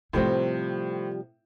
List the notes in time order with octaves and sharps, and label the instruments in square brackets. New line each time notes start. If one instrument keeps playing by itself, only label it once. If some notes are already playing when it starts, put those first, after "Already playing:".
[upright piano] A2 C4 [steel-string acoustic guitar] C3 F3 G3 [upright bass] A3 E4